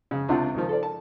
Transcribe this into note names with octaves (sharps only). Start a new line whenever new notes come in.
C#3
C#2 C3 D4 F4 F#5
C#2 D#3 F3
A4 C5 D5
A5